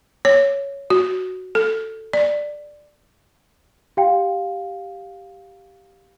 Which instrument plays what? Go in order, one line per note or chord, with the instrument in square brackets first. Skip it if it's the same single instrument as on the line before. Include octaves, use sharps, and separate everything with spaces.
[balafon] C#5
F#4
A4
D5
[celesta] G4 F5 G5